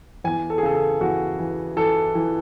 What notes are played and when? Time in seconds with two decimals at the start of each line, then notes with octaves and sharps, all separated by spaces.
0.24 E2 G#5
0.50 A4
0.58 G#4
0.63 C#3 A4
0.75 A4
1.01 E2 F#4
1.39 E3
1.77 E3 A4
2.15 E3